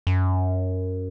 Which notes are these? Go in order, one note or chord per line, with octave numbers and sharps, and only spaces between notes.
F#2